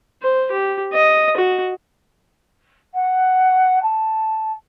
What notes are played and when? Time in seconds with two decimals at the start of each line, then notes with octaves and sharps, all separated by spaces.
0.22 C5
0.51 G4
0.93 D#5
1.37 F#4
2.94 F#5
3.82 A5